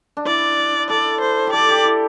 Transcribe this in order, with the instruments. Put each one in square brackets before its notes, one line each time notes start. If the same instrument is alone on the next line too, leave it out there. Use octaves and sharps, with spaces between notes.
[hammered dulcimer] D4
[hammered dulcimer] E4 [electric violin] D5
[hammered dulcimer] A4 [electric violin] D5
[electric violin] C5
[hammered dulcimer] G4
[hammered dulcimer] A4 [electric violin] D5
[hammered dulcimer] G4
E4